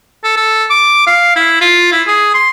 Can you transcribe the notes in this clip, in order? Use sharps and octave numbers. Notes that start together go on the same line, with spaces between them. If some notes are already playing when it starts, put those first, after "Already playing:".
A4
A4
D6
F5
E4
F4
E4
G#4
C6